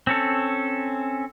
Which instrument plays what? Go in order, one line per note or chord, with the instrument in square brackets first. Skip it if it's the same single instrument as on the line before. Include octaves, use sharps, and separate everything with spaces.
[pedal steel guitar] C4 C#4 A4